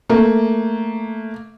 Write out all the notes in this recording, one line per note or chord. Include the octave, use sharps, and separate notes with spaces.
A3 A#3